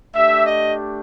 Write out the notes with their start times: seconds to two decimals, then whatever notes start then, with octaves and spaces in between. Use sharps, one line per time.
0.14 A3 D4 G4 E5
0.46 D#5